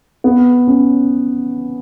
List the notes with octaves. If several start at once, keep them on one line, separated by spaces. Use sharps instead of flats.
B3
C#4